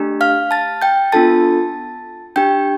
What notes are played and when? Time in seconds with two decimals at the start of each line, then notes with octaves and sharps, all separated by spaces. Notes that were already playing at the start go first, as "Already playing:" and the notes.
Already playing: A3 D4 G4
0.21 F5 F6
0.51 A5 A6
0.82 G5 G6
1.12 B3 D4 F4 A4 A5 A6
2.36 D4 G4 G5 G6